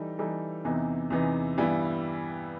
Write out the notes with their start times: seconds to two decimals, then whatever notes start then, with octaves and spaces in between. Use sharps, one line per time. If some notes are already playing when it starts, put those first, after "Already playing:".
Already playing: E3 G3 D#4 A4
0.19 E3 G3 D#4 A4
0.64 E2 C3 E3 B3 D#4
1.10 E2 C3 E3 B3 D#4
1.57 G2 E3 G3 B3 E4